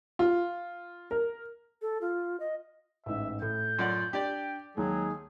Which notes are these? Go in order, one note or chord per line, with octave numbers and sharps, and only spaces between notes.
F4
A#4
A4
F4
D#5
A1 G#2 E5
A2 G6
F#2 F4 D5 F#5
D4 G4 D5 G5
D#2 D#3 F#3 G#3 G#4